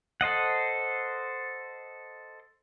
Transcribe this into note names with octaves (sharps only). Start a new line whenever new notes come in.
A4 C5 D#5 F#5